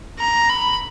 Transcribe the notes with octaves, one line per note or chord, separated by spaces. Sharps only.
A#5
B5